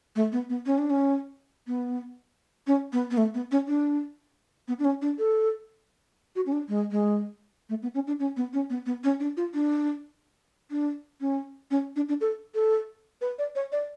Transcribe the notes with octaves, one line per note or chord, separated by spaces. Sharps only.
A3
B3
B3
C#4
D4
C#4
B3
C#4
B3
B3
A3
B3
C#4
D4
B3
D4
C#4
D4
A4
F#4
C#4
D4
G#3
G#3
A3
B3
C#4
D4
C#4
B3
C#4
B3
B3
C#4
D4
F4
D4
D4
C#4
C#4
D4
D4
A4
A4
B4
D5
C#5
D5